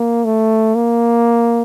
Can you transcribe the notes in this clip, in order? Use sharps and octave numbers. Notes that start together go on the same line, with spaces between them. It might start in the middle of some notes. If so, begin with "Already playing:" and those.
Already playing: A#3
A3
A#3